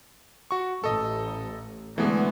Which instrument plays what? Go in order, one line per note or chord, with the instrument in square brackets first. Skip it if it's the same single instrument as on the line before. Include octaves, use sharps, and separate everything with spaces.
[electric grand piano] F#4 C#6
[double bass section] A1 [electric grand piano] A4 D#5
[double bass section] D2 A3 B3 [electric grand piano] E3 G#3